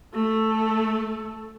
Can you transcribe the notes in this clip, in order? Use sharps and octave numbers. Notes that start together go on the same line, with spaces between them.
A3 A4